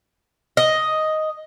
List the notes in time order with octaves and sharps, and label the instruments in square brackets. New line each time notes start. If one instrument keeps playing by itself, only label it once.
[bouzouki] D#5